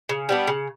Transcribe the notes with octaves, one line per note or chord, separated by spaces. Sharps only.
C#3
G3 B3 D4
C#3